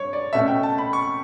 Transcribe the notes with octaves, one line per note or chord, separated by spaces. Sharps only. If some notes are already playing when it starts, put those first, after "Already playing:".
Already playing: G2 C#5
D5
B2 A3 C#4 E5
G5
A5
B5
C#6